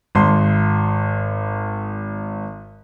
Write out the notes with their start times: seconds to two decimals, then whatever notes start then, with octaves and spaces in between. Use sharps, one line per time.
0.15 G#1 C6